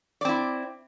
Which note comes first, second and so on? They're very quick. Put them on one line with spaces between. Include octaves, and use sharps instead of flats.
D5 C4 E4